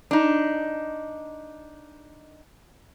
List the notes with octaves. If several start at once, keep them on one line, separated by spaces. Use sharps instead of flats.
D4 D#4